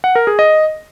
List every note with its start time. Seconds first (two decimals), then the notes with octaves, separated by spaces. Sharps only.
0.04 F#5
0.15 A#4
0.27 G#4
0.39 D#5